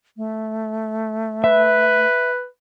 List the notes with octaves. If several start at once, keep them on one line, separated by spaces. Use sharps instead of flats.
A3
B4 E5